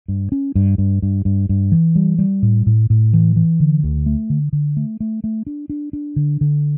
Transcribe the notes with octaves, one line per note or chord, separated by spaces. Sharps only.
G2
C#4
G2
G2
G2
G2
G2
E3
G3
G3
A2
A2
A2
E3
E3
D3
D2
A3
D3
D3
A3
A3
A3
D4
D4
D4
D3
D3